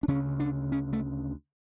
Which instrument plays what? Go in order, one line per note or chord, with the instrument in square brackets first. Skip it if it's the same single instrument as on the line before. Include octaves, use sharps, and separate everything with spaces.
[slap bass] D4
D2 C#3 C#4
D4
C#4
A3